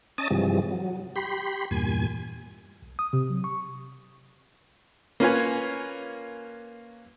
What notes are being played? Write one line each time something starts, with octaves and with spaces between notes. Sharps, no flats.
C#4 D#5 A5 D#6 A6
G2 C3 E3 F3 G3 G#3
F#3
G4 B5 C6
E2 G2 A#2 G#5
B1
D#6
C3
F#3
C#6
A#3 C#4 F4 B4 C#5 G#5